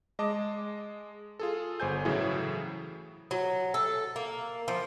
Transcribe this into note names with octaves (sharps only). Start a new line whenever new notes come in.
G#3 D#5 A5 D6
F4 G#4 A4
G1 C5 G#5 G6
A2 C#3 E3 F#3 E4 G#4
F#3
A4
A#3
F3